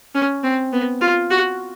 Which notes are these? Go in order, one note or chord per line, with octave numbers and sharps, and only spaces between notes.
C#4
C4
B3
F4
F#4